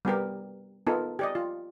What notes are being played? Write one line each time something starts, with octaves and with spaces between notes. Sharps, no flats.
G3 B3 G4 A#4
B3 D#4 F4 A4 A#4
G4 D5 D#5
F4